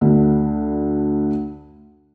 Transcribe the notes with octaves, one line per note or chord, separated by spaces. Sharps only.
D2 D3